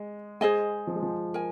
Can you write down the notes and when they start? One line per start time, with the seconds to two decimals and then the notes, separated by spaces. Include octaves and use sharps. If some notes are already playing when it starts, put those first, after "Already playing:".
Already playing: G#3
0.41 G#3 G#4 C5 D#5 G#5
0.87 F3
0.95 G#3
1.03 F3
1.34 A#4 G#5